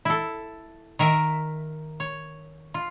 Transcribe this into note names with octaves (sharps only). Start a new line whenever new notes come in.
E4 A4
D#3 A#4 E5
C#5
F4